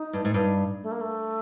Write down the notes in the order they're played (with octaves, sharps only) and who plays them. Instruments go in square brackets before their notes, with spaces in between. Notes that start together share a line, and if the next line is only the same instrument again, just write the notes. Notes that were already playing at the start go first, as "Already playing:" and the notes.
Already playing: [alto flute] D#4
[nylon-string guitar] G2
G#2
G2
[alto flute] A3
A#3
A3